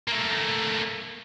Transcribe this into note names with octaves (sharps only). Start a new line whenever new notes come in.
A3 A#3